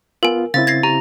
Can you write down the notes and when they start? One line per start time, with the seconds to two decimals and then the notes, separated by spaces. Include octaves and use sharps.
0.23 B3 F4 A#4 G#5
0.54 C#3 C4 E4 F5 A6
0.67 G#6 A#6 C7
0.83 G4 A#5